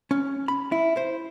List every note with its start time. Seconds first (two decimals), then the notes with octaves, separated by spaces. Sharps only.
0.11 C#4
0.48 B5
0.72 E4
0.97 C5